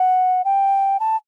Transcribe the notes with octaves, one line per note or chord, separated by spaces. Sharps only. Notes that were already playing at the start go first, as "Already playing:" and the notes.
Already playing: F#5
G5
A5